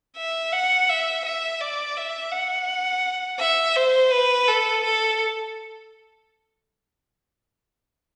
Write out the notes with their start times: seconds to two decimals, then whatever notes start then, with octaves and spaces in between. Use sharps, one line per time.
0.17 E5
0.52 F#5
0.89 E5
1.25 E5
1.61 D5
1.97 E5
2.32 F#5
3.40 E5
3.75 C5
4.12 B4
4.48 A4
4.83 A4